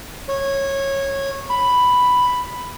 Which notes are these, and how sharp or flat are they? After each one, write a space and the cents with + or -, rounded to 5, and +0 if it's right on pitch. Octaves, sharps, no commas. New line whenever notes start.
C#5 -15
B5 +5